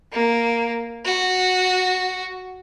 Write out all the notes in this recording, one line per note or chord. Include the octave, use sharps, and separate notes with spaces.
A#3
F#4